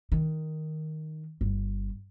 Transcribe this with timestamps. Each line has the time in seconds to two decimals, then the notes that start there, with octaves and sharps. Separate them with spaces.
0.12 D#3
1.41 G1